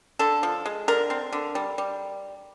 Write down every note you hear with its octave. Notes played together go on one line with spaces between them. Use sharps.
D3 A4
F3
G#3
D3 A#4
C4
D3
G3
G3